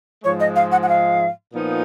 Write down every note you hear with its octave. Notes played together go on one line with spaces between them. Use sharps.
G#2 F3 G#3 C#5
D#5
F5
F#5
F#5
F5
A#2 F3 B3 D#4